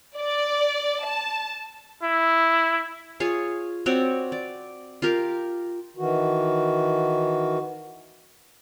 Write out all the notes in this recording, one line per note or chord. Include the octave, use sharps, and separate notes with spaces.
D5
A5
E4
F4 G#4 C#5
C4 F#4 C#5 D5
D5
F4 G4 A#4
D#3 E3 F#4